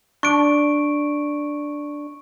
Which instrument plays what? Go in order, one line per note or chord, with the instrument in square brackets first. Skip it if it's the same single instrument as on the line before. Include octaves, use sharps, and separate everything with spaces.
[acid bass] D4 [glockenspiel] C#6 D7